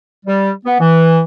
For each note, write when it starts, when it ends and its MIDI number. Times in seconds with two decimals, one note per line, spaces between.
0.25 0.51 55
0.65 0.77 59
0.79 1.21 52